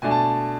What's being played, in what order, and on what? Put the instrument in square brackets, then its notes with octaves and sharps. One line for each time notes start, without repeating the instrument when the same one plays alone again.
[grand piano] B2 A3 D4 G#5
A5